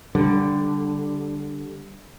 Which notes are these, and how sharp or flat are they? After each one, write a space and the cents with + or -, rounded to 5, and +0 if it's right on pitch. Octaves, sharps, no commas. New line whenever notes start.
D3 +0 G3 +0